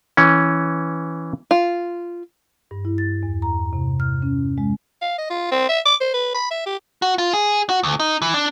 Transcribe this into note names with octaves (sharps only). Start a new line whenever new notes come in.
E3 C#4
F4
G2
E4
A6
E2
A#5
C3
F6
C#4
G#3
F5
D#5
F4
C4
E5
D6
C5
B4
B5
E5
G4
F#4
F4
G#4
F#4
D2
D#4
E3
D4